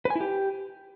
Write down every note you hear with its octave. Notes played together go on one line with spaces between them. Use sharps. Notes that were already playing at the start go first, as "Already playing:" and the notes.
B4
G#5
E4
G4